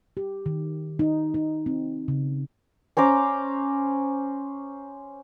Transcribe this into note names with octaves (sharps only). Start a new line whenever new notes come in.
G4
D#3
D#4
D#4
C4
C#3
C#4 C5 A#5 D6